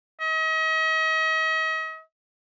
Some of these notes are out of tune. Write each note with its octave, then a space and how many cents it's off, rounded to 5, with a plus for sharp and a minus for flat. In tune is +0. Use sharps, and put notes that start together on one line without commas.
D#5 +40